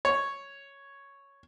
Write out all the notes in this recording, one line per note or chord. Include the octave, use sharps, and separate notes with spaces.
C#5